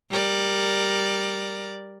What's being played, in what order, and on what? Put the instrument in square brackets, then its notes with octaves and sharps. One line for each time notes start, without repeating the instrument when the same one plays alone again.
[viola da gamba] G3 A#4 D5